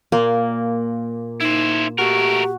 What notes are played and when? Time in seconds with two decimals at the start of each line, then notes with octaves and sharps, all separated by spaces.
0.12 A#2 A#3
1.41 D#4 E4 C5
1.98 A3 F#4 G4 A#4